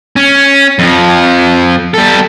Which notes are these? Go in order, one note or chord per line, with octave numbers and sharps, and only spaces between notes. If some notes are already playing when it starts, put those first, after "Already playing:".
C#4
F2 F3
G3 A4